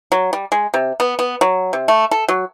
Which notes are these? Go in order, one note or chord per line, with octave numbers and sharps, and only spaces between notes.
F#3
G3
G#3
C3
B3
B3
F#3
C3
A3
A4
F#3